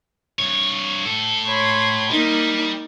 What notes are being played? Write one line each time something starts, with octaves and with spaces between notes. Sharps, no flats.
G2 C#5
A2 A4
C#5 B5 C6
G3 A#3 D#4